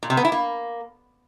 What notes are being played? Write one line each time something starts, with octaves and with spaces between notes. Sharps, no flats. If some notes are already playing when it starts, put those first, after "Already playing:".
A#2
C3
B3
E4
A#3